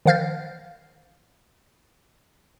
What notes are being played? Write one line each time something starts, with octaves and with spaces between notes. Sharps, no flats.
D#3 F3 F5 F6 G6 A6